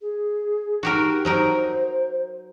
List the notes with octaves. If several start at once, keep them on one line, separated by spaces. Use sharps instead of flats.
G#4
D#4 F#4 G4 A#4
F#3 D#4 A#4 C5